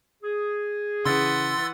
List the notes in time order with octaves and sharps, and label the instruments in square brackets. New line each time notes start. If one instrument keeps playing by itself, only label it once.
[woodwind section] G#4
[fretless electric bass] C#3 [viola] E3 F#5 [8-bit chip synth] C6 E6 A6